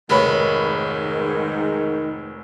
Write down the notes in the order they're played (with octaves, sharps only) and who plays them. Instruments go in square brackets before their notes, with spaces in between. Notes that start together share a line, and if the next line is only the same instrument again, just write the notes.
[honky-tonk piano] F1 B4 C#5 [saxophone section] G#2 D#3